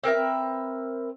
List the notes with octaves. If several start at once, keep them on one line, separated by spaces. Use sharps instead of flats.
C4 A#4 B4 E5